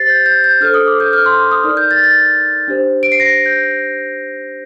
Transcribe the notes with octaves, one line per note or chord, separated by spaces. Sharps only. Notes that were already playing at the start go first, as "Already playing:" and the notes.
Already playing: G4 C5 A6 C7
G6
G6
G6
D4 A4 C5 F6
D#6
D6
G6
F6
C6
D6
D#6
D#4 A#4 D5 F6
G6
A6
A6
D4 G4 C5
D7
C7
A#6
G6